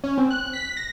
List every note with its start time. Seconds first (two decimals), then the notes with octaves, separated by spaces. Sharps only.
0.04 C#4
0.18 C4
0.31 F#6
0.53 B6
0.77 A#6